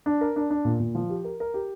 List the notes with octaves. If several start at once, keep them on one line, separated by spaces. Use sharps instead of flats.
D4
A#4
D4
D4
A#2
A#2
F3
G4
A#4
A#4
G4